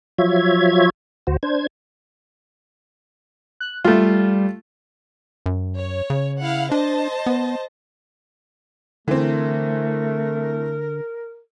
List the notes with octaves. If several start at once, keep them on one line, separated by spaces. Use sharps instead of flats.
F3 F#3 F4 C#5 E5 G#6
D2 F#4 C5
D4 C5 G#6
F#6
G3 A3 F4
F#2
C#5
C#3
E4 F5 F#5
D4 C5 D#5 A5
B3
D3 E3 A3 C4 A#4